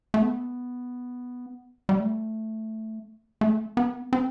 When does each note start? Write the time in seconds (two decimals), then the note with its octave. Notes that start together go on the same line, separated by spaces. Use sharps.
0.14 A3
0.22 B3
1.89 G3
2.00 A3
3.41 A3
3.77 B3
4.13 C4